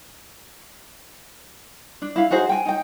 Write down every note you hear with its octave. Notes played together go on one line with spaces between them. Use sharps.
D4
E4 F5
D#4 F#4 G#4 C5
G5 G#5
D#4 G5